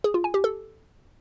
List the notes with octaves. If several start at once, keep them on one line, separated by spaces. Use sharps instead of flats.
G#4
F4
G#5
G4
A4